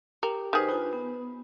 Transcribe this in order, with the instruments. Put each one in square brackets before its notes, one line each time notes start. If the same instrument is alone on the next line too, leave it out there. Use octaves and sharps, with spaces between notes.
[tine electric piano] G4 [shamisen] A#4
[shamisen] D#3 G#4 [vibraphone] B4 C5
[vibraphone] D4 F4 G#5 [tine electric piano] B4
[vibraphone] B3